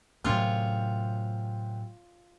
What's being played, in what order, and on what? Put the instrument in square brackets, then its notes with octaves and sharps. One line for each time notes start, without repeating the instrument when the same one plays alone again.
[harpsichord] F#2 C3 [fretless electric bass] A2 F#3 [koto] F4 C#5